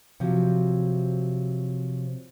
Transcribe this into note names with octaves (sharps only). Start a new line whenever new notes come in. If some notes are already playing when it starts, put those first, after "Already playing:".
C3 F3 F#3